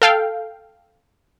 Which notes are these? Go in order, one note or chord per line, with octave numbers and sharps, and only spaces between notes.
A4 F5 G5